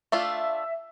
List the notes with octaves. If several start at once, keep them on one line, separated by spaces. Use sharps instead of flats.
A3 D4 F4 E5